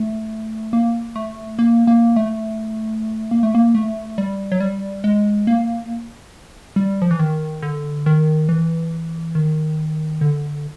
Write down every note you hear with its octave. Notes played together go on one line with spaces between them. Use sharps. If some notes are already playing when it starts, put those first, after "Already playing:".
Already playing: A3
A#3
A3
A#3
A#3
A3
A#3
A3
A#3
A3
G3
F#3
G3
G#3
A#3
G3
F3
E3
D#3
D3
D#3
E3
D#3
D3